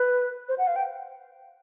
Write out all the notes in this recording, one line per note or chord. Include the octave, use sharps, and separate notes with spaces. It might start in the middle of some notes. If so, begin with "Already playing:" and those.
Already playing: B4
C5
F#5
F5
G5